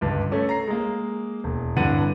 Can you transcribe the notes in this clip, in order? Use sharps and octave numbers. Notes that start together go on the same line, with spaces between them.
C#2 G2 D3
A3 C#4 A4
A#5 C7
G#3 A#3
E1
D1 G2 D3 F#5 D#7